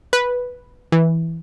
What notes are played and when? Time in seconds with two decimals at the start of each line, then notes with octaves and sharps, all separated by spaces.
0.13 B4
0.92 E3